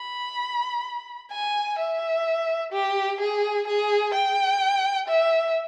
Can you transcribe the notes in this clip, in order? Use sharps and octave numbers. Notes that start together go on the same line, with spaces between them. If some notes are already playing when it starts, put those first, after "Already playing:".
Already playing: B5
G#5
E5
G4
G#4
G#4
G5
E5